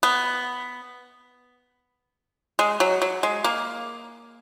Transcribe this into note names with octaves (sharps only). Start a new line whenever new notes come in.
B3
G#3
F#3
F#3
G#3
A#3